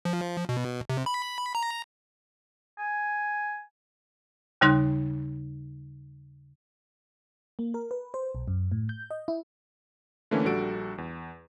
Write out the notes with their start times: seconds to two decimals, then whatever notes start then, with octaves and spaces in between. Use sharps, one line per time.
0.05 F3
0.49 B2
0.90 C3
1.06 B5
1.55 A#5
2.79 G#5
4.61 D#2 C#3 G3 D#4 C6 F#6
7.59 A#3
7.74 A#4
7.91 B4
8.14 C5
8.35 B1
8.48 F#2
8.72 A2
8.89 G6
9.11 D#5
9.28 E4
10.31 D3 E3 A3 A#3 C#4
10.45 A#1 G3 D4 F#4 A4 D7
10.98 E2